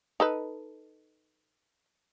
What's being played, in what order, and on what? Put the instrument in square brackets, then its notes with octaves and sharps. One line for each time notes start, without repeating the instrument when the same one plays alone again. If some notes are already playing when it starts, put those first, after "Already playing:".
[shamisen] D#4 A4 B4